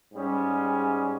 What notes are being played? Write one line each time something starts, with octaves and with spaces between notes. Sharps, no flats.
G#2 G3 C#4 G#4